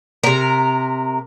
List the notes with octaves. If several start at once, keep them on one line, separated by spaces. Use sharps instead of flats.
C3 A#4